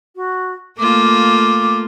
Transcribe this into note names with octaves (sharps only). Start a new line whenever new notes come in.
F#4
A3 A#3 F4 D6